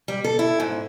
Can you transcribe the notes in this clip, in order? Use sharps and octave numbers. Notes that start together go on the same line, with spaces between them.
G3
A4
E4
G#2